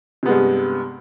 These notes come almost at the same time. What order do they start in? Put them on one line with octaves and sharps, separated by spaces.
C3 B3 G#3 G2